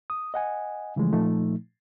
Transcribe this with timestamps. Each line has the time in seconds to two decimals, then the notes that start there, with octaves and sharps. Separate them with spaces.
0.10 D#6
0.34 D#5 F#5 G#5
0.96 C#3 E3 F3 G#3 A3
1.13 A#2 F3 A3 D#4